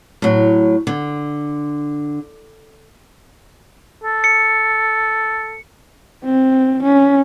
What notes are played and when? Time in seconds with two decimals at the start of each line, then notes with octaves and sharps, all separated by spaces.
0.22 A2 F#3
0.87 D3
4.04 A4
4.24 C#7
6.24 C4
6.84 C#4